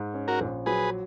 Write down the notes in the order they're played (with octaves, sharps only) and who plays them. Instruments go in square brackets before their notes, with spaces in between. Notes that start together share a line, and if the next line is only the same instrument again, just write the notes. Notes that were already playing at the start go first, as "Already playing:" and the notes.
Already playing: [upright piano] G#2
C#4
[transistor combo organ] F#4 A#4
[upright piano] A#1
[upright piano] F#3 [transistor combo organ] G#4 B4